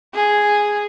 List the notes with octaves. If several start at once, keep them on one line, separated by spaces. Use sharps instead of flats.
G#4